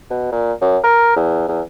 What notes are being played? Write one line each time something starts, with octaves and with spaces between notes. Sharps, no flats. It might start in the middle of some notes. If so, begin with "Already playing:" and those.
B2
A#2
F#2
A#4
E2
E2